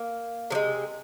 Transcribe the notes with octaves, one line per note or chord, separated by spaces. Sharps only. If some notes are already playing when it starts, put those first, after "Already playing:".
Already playing: A#3
C3 F3 G#3